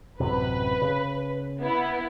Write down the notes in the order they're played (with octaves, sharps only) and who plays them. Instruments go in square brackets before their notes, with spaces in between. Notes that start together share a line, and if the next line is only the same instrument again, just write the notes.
[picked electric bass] A1 F#2 C3 [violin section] B4
[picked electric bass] C#3
[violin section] B3 E4